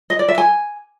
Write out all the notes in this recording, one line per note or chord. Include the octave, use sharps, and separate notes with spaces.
D#5
D5
E5
G#5